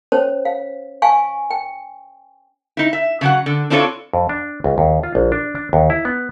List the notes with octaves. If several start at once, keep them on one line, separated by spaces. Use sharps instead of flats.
C#4 C5 C#5
F5
F5 G#5 C#6
G5
D#4 E4
E5
C#3 F#3 F#5
D3
C4 D4 E4 F4 A4 C#5
F2
D4
C#2
D#2
F4
A#1
D4
D4
D#2
E4
B3